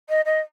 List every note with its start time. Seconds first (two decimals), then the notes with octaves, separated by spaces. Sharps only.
0.09 D#5
0.25 D#5